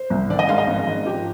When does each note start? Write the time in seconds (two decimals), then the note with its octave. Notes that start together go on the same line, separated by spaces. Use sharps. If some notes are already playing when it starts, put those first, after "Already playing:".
Already playing: C5
0.10 C2
0.30 D#3 D5
0.39 D#5
0.49 G#2 F5
0.58 D#5
0.67 G#1
0.86 G#1
1.06 F3 G4